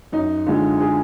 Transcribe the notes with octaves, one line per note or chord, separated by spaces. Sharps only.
F#2 D#4
D3 G#3 F4
G#4